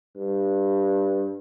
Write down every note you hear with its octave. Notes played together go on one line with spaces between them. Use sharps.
G2